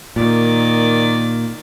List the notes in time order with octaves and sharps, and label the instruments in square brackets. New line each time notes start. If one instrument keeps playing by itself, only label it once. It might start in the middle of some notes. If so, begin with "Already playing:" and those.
[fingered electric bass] A#2 [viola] D#3 D5